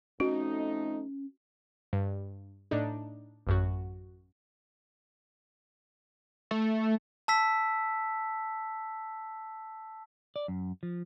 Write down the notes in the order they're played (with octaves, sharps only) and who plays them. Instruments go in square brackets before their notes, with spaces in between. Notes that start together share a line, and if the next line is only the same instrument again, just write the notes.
[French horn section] F2 A3 D#4 [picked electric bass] C#4 [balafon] F#4
[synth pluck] G2
A2 D4 D#4
A1 F#2 F#4
[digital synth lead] A3
[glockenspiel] A5 E6 B6
[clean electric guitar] D5
F#2
F3